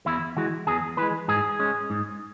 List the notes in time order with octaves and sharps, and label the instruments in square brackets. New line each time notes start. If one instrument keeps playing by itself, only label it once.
[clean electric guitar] E2 E4
E3 G#3 F#4
E2 G#4
E3 G#3 B4
G#2 G#4
G#3 C#4
G#2